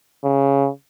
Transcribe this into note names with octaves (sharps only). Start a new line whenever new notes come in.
C#3